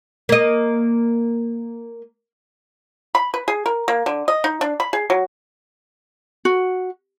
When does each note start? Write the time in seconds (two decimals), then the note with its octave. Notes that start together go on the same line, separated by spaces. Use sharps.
0.29 A#3 D#5
3.15 B5
3.34 B4
3.48 G#4
3.66 A#4
3.88 A#3
4.06 D3
4.28 D#5
4.44 D#4
4.61 D4
4.80 B5
4.93 G#4
5.10 F#3
6.45 F#4